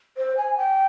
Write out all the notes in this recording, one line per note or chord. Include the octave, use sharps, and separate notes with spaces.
C5
G#5
G5